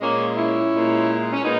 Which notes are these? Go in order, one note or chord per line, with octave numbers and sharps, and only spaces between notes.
A#2 G#3 A#3 C#4
C#4 E4
A#2 G#3
C#4
A#2 G#3 B3 D#4